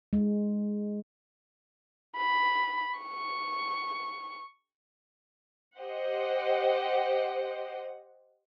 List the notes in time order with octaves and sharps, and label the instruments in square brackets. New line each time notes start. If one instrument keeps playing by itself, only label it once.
[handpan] G#3
[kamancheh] B5
C#6
[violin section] G4 C5 D#5 F#5